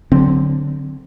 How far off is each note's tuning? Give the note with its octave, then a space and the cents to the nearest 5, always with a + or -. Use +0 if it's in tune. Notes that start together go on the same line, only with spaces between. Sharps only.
D3 +0 F#3 +0 C4 +0